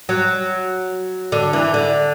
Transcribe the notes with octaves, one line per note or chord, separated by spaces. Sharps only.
F#3
D3
E3
D3